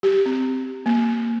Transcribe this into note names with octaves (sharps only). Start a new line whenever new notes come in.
G4
C4
A#3